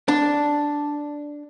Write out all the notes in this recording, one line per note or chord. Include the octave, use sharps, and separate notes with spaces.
D4